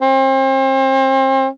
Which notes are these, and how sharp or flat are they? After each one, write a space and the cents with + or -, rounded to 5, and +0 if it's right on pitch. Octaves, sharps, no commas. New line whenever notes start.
C4 +35